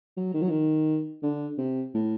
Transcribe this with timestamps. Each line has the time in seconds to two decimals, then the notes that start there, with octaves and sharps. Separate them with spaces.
0.17 F#3
0.34 D#3
0.42 F#3
0.49 D#3
1.22 D3
1.58 C3
1.94 A2